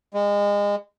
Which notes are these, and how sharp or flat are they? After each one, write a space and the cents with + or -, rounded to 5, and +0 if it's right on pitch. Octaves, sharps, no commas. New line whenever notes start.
G#3 -30